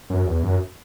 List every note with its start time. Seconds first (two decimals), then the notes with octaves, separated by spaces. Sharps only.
0.10 F#2
0.26 E2
0.43 F#2